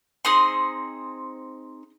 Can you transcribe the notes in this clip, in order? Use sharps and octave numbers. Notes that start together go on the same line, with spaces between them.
C4 D#4 G#4 C6 D#6